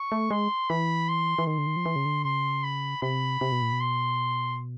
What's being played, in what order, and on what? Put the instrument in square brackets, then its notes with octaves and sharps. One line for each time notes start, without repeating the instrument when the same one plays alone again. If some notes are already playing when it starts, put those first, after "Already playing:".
Already playing: [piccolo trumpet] C#6
[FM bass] A3
[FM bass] G#3 [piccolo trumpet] C6
[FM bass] E3 [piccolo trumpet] B5
[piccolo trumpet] C6
[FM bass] E3
[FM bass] D#3 [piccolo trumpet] C6
[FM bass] D3
D#3
F3
E3
C#3
D3
[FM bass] C#3 [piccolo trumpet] C6
[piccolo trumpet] B5
[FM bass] C3 [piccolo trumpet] B5
[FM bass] C3
B2
A#2
B2
[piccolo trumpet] C6